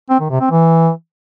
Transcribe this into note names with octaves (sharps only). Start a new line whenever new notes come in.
C4
D#3
C3
C4
E3